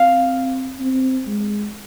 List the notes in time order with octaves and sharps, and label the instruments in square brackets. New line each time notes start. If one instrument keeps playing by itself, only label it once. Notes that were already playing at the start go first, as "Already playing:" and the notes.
Already playing: [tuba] C4 [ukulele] F5
[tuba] C4
G#3